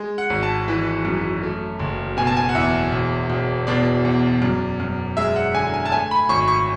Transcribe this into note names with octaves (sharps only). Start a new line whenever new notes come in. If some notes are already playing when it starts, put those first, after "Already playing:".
Already playing: G#3
F#5
G#1
A5
E3
F#2
A3
F#1
B2 G#5
A5
G#5
F#5
E2 E5
E1
E1
B2 D5
E2
F#2
F#2
G#3 E5
F#5
D3 G#5
G#5
A5
A3 G#5
B5
G#1 C#6
C#6